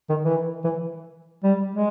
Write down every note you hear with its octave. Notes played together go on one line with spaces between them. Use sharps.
D#3
E3
E3
G3
G#3